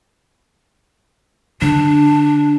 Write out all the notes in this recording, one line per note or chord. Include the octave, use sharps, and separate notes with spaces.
D3 D4